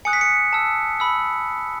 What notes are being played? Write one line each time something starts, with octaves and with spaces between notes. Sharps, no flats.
G#5 D#6 F#6 C#7
B6
C#7
A5 E6
B5 E6